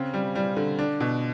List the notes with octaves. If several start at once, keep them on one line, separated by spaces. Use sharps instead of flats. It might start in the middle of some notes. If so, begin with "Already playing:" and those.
Already playing: C#3 C4
G3
G3
D3
D4
B2